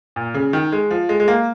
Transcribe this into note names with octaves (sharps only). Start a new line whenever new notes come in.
A#2
C#3
D#3
G#3
F3
G#3
G#3
A#3